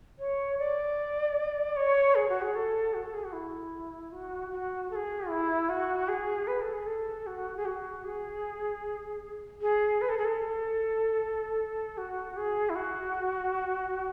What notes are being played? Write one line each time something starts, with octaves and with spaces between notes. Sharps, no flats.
C#5
D5
C#5
G#4
F#4
G#4
A4
F#4
A4
G#4
F#4
E4
F#4
F#4
A4
G#4
E4
F#4
G#4
B4
A4
G#4
A4
F#4
G#4
F#4
G#4
G#4
B4
A4
G#4
A4
F#4
G#4
E4
F#4